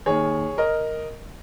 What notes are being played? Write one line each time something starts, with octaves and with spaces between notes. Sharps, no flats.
D#2 D#3 G#4 C#5
A#4 D#5